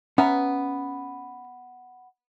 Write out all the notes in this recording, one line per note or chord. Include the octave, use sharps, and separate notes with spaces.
B3 C#4 E5 A#5